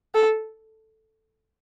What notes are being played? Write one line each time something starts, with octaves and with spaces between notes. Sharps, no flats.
A4